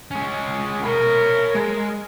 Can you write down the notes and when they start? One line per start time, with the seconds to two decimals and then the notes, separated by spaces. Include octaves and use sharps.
0.11 G#3 C#4
0.84 A#4 C#5 B5
1.55 G#3